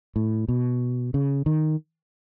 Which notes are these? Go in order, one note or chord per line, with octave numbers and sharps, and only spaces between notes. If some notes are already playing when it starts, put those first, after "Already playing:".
A2
B2
C#3
D#3